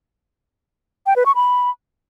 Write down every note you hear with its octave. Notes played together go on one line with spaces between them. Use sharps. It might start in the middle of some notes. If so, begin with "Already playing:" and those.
G5
B4
C#6
B5